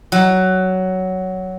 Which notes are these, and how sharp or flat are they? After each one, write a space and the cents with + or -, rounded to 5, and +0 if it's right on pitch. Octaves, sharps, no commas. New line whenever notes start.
F#3 +10